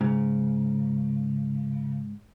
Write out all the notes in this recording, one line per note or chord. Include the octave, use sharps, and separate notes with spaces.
G#2 C#3